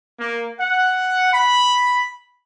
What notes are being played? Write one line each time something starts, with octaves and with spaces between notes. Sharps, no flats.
A#3
F#5
B5